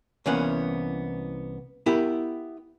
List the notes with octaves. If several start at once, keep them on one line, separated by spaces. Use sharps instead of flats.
C2 E3 A#3 B3 C#4 F#5
B3 E4 G4 A#4